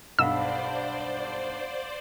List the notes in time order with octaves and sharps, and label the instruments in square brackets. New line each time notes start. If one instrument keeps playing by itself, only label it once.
[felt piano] B1 G2 [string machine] C5 D5 [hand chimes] F5 F#5 B5 [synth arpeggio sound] E6